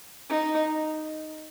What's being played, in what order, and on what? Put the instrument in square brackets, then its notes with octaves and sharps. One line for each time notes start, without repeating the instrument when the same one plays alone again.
[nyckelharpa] D#4